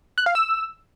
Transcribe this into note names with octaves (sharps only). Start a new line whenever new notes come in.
F#6
F5
E6